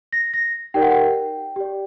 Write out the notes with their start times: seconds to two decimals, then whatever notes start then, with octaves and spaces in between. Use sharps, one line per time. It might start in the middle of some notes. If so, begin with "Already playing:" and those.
0.13 A#6
0.34 A#6
0.74 D#4 G4 A#4 D5 G5
0.82 F#5
0.91 G5
1.56 G4 D5